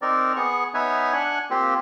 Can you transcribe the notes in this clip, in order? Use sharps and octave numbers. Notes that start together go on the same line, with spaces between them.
C4 D#4 A#4 D5
B3 G#4 C#6
B3 D#4 B4 C#5 E5 G#5
D4 F#5 G#5
A#3 C4 F4 G4